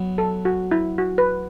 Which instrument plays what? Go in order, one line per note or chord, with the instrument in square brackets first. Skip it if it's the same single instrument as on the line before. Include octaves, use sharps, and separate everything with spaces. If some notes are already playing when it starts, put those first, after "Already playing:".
Already playing: [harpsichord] F#3 B3
[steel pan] A4
F#4
E4
F#4
B4